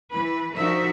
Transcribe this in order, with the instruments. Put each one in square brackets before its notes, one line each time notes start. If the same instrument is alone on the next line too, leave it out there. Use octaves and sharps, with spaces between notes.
[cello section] E3 B4
F3 D4 D#4 F#4 A#4 E5